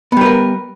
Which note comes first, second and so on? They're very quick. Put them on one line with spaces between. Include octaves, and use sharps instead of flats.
B3 G3 B4 A#4